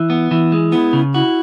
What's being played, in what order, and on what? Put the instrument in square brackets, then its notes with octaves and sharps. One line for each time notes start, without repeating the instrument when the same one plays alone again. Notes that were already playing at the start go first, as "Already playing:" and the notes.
Already playing: [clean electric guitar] E3
B3
E3
G#3
[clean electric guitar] B3 [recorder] E4
[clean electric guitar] C#3
[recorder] E4 [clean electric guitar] F#4